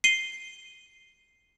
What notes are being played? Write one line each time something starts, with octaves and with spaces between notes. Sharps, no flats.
C7 D#7 G7